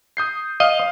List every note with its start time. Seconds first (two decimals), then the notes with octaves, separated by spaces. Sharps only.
0.17 D#6 G6 C7
0.60 D#5 F5